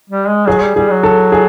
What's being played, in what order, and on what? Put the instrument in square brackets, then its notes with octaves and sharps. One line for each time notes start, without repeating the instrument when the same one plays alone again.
[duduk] G3
G#3
[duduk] F#3 [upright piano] G#4
[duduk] G3
[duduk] G3 [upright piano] G#4
[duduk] F#3
[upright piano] A4
G#4